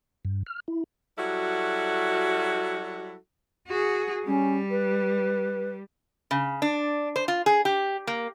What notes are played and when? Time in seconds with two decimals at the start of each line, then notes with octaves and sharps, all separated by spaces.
0.25 G2
0.46 F6
0.68 E4
1.18 F#3 G3 E4 F#4 A4
3.68 F#4 G#4
4.26 G3 C#4
4.70 B4
6.31 C#3
6.62 D4
7.16 C5
7.28 F4
7.46 G#4
7.65 G4
8.07 A#3